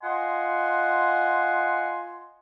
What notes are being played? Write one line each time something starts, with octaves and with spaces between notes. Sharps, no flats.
F4 D#5 F#5 G#5 C6